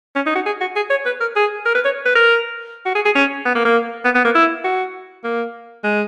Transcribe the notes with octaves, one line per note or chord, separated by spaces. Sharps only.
C#4
D#4
F#4
G#4
F#4
G#4
C#5
B4
A#4
G#4
A#4
B4
C#5
B4
A#4
F#4
G#4
G#4
C#4
B3
A#3
A#3
B3
B3
A#3
E4
F#4
A#3
G#3